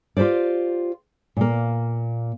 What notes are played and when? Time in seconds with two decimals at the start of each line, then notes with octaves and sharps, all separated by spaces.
0.17 F4 G4 A4 C5 D5
1.37 A#2 A#3